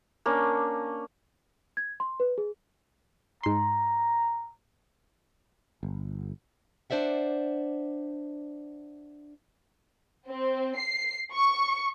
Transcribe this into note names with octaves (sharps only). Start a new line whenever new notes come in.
A#3 C#4 D4
G#6
C6
B4
G#4
G#2 A#5 C6
G1
D4 C5 D5 E5 F#5
C4
C7
C#6